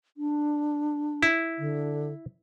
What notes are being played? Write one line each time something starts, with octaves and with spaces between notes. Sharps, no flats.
D4
E4
D3